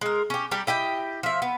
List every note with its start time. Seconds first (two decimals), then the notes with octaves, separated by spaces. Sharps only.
0.01 G#3 A#4
0.30 C#4 G4
0.51 G3 D4 G4 A#5
0.67 E4 G4 D#5 G5
1.23 F3 E5
1.42 B3